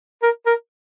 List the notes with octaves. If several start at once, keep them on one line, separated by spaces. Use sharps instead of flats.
A#4
A#4